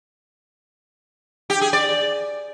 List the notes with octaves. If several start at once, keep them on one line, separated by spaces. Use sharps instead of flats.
G4
G#4
D5